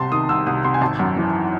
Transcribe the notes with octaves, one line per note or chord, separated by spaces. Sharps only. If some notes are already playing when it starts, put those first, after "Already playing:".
Already playing: C2 C3 A5 C6
D#3 D#6
C2 E6
C2 D#6
C3 C6
G#5
G#1 A5
F#2
E3